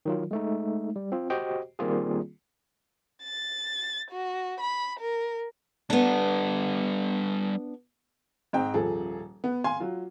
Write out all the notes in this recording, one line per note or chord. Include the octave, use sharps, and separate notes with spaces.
D#3 F#3 F4
G#3 A3 D#4
G3
C4 F4
F#4 G4 C5 D#5 G5
D#3 G3 A#3 C4 F4 G#4
A6
F#4
B5
A#4
G3 B3 D4 A4
G#2 C4 D#5 G5
D#1 F3 G#4 A4
B3
F5 G#5 C6
F#3 F4